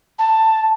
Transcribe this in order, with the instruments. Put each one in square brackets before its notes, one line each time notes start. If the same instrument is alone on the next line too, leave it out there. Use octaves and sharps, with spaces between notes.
[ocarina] A5